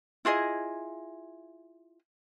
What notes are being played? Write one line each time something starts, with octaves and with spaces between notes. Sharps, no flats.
E4 F4 G#4 D#5